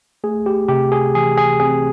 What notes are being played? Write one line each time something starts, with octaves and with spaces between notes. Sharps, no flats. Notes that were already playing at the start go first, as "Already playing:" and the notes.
A3 G#4
G4
C3 G4
G#4
E3 G#4
G#4
C4 G#4